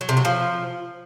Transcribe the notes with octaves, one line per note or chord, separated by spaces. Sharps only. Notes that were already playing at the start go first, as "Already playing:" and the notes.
F#3
C3
F#3
F3